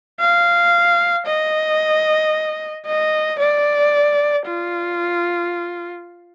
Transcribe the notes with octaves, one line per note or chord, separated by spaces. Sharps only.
F5
D#5
D#5
D5
F4